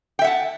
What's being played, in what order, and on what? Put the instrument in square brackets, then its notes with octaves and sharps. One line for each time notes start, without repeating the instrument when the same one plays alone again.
[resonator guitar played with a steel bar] G5
E5
F#5
A5